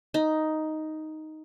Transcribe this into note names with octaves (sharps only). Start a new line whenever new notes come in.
D#4